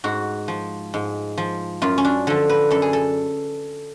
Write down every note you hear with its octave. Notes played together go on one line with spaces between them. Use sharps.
G#2 F#4
F3
G#2
F3
F#2 F4
C#4
D4
D3 F3 A4
B4
F#2 A4
G#4
A4